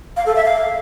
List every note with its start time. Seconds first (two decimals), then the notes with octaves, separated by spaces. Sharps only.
0.17 F5
0.26 A4
0.36 E5
0.45 F5